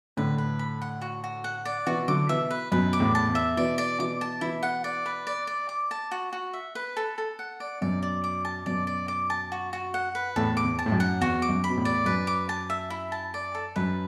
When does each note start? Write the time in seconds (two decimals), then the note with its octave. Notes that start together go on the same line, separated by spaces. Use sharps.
0.17 A2 D3 B4
0.38 B4
0.59 B5
0.82 F#5
1.02 F#4
1.24 F#4
1.44 F#5
1.65 D5
1.86 B2 E3 F#4
2.08 D3 F#3 D6
2.29 B2 E3 E5
2.51 B4
2.72 F#2 B2 B4
2.93 D6
3.00 E2 A2
3.15 A5
3.28 E2
3.35 E5
3.57 B2 E3 D5
3.78 D5
3.99 B2 E3 D6
4.21 A5
4.41 B2 E3 E4
4.63 F#5
4.84 D5
5.06 B4
5.27 D5
5.47 D5
5.69 D6
5.91 A5
6.11 F#4
6.33 F#4
6.53 E5
6.75 B4
6.97 A4
7.18 A4
7.39 F#5
7.60 D5
7.81 F#2 B2 D5
8.03 D5
8.24 D6
8.45 A5
8.66 F#2 B2 D5
8.87 D5
9.08 D6
9.30 A5
9.52 F#4
9.73 F#4
9.94 F#5
10.15 B4
10.36 E2 A2 A4
10.57 D6
10.64 E2
10.79 A5
10.86 A2
10.92 F#2
11.00 F#5
11.21 E2 F#4
11.42 D6
11.49 F#2
11.64 B5
11.69 B2
11.77 E2 A2
11.85 D5
12.06 F#2 B4
12.27 D6
12.49 A5
12.70 E5
12.90 E4
13.12 A5
13.34 D5
13.55 A4
13.76 F#2 B4